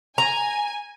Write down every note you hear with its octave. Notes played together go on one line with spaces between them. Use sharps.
G#5 A#5